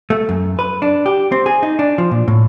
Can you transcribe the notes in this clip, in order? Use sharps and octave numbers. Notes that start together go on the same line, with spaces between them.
A3
F#2
B4
D4
G4
C4
G#4
D#4
D4
F3
A#2
A2